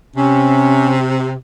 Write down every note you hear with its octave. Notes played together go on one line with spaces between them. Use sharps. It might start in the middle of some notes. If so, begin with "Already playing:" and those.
C3 C#4